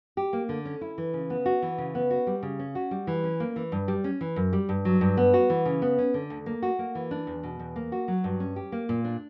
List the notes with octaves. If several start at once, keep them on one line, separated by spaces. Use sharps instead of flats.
G4
A#3
D3
C#4
E4
E3
C#3
B3
F#4
E3
C#3
B3
F#4
G3
C#3
C#4
F#4
G3
E3
C#4
A#3
E3
G2
G3
C#4
E3
F#2
G3
G2
F#3
G2
B3
F#4
E3
C#3
B3
C#4
D3
D2
A#3
F#4
A#3
E3
D4
E2
B2
E2
A#3
F#4
F#3
G2
C#4
G4
A#3
A#2
D4